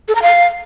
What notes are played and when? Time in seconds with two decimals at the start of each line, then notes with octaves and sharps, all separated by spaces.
0.08 A4
0.15 A#5
0.22 F5